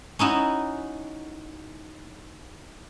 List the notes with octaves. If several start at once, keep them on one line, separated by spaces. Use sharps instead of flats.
C#4 D#4 E4 F#4